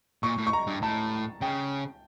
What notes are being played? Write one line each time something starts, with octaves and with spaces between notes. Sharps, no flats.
A#2 C#6
A2
C#6
A#5
G2
A2 A5
C#3 G5